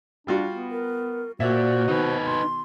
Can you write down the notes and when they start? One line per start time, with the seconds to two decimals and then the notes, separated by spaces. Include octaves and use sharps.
0.27 G3 D4 F4 F#4
0.51 B3
0.71 A#4
1.40 A#2 F#4 C5 E5
1.88 B2 D#3 D#4 B4
2.26 C6